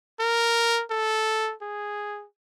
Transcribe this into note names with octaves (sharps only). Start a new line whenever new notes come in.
A#4
A4
G#4